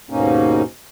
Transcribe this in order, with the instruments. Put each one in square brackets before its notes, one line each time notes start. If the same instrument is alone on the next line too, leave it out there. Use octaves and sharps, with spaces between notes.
[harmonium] D#2 G#2 B2 A#3 C#4 D#4